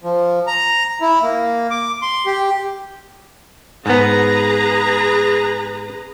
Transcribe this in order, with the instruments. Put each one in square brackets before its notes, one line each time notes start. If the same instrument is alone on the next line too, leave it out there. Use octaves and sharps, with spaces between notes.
[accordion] F3
A#5
E4
A#3
D6
C6
G4
[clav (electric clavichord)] G#2 B3 [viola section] G#4 B4 A#5